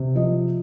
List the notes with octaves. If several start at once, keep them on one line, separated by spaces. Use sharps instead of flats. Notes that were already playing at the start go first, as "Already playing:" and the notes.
Already playing: C3
F3 D#5